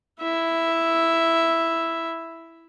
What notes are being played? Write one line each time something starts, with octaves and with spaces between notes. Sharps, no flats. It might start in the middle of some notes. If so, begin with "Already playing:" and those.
E4 E5